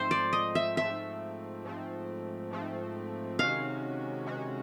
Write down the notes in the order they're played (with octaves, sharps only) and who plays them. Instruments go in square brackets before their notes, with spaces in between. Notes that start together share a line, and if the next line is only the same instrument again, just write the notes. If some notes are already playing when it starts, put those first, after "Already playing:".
Already playing: [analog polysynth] G#2 F3 A3 C4 [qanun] C5
[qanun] D5
D#5
E5
[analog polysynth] G#2 F3 A3 C4 [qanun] E5
[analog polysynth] G#2 F3 A3 C4
G#2 F3 A3 C4
[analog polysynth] C3 D#3 G#3 C#4 F#4 [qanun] F5
[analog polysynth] C3 D#3 G#3 C#4 F#4